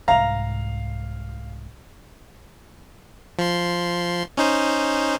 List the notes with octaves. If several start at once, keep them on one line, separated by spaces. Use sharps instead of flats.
C2 G#2 F5 A#5
F3 C6
C#4 D#4 C5